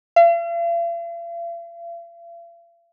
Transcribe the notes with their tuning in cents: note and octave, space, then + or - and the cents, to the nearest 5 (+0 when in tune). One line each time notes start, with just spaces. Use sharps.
F5 -45